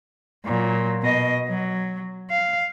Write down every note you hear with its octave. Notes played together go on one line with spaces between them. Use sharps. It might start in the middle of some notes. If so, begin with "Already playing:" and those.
A#2 F#3
B2 D#5
F#3
F5